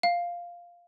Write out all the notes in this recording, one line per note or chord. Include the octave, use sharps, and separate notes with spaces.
F5